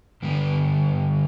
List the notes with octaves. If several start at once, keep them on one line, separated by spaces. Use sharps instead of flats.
G2 D3 G3 B3